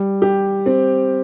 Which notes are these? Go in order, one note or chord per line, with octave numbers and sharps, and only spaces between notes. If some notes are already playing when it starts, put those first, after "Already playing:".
Already playing: G3
G4
C4